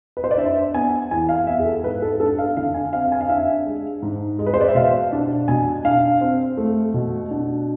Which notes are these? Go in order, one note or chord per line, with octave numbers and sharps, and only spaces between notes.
B4
C5
D5
D4 E5
B3 G#5
E2 G#5
F5
B3 E5
G#4
A4
G#2 B4
A4
D4 A4
F5
D3 F5
G#5
C4 F5
F5
G#5
F5
D4 E5
G#3
G#2
G#3
B4
C5
D5
E5
B2 F5
D4
B2 G#5
D4 F5
C4
A3
B2
D4